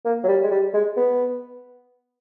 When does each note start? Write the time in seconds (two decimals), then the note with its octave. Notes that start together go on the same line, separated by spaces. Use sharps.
0.05 A#3
0.24 F#3
0.28 G3
0.43 G#3
0.51 G3
0.74 G#3
0.97 B3